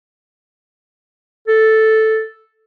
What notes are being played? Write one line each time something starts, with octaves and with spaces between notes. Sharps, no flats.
A4